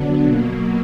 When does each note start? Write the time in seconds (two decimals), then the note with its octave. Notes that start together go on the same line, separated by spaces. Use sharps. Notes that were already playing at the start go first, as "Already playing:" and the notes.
Already playing: D3 F#3 B3 D4
0.24 B2 F#3 A#3